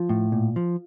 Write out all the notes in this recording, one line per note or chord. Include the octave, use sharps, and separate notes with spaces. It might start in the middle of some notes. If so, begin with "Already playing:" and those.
Already playing: F3 F4
A2
A#2
F3